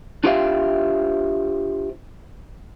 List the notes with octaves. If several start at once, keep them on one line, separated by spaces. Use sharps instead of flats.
D4 F4 G4 C5 E5 F5